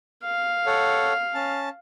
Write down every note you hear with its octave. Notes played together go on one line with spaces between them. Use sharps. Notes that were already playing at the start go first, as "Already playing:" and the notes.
F5
A4 C#5 F#5
C#4 A5